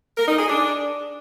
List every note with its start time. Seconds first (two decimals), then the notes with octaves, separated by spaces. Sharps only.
0.17 A#4
0.28 D#4
0.39 G#4
0.49 D4